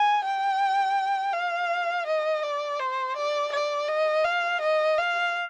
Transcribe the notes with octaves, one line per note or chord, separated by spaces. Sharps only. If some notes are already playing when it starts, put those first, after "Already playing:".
Already playing: G#5
G5
F5
D#5
D5
C5
D5
D5
D#5
F5
D#5
F5